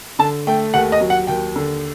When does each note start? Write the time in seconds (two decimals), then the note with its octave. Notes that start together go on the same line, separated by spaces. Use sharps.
0.19 D3 A5
0.47 A3 G5
0.74 D#2 F#5
0.92 D#5
1.01 F#3
1.10 F#5
1.27 D#2 G5
1.56 D3